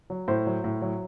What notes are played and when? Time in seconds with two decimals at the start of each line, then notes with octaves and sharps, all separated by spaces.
0.10 F#3
0.28 A2 C5
0.47 F#3
0.64 A2
0.82 F#3